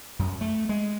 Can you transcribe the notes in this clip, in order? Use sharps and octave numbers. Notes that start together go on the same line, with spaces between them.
F#2
A3
G#3